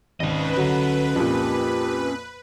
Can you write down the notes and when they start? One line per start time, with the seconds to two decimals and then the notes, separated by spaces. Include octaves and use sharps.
0.20 G#1 C#4 B4 D#5
0.57 D3 F#3
1.16 F2 A#2 G4